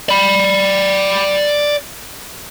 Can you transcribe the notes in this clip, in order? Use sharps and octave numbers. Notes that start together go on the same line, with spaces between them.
D5 B5